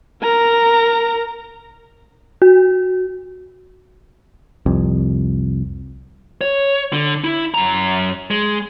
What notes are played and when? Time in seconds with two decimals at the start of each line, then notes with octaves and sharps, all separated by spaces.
0.23 A#4 A#5
2.42 F#4
4.66 C2 F2
6.41 C#5
6.93 D3
7.24 E4
7.54 F#2 A#5
8.31 G#3